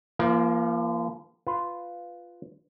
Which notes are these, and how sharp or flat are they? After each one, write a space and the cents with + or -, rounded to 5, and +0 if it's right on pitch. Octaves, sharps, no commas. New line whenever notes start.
F3 -35 A#3 +10
F4 +0 B4 +10